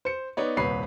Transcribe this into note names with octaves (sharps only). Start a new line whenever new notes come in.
C5 C#7
B3 D#4 C#5 D5
D#1 C2 B4 C#5 C7